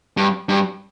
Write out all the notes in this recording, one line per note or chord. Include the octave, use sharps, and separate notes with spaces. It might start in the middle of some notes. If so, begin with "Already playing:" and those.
G2
G2